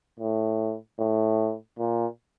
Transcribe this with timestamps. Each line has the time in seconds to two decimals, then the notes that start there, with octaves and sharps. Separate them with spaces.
0.20 A2
0.99 A2
1.79 A#2